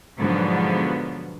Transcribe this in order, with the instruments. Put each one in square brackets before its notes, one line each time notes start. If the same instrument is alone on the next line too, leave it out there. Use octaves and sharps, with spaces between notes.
[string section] G#2 B2 D3 F3 F#3 B3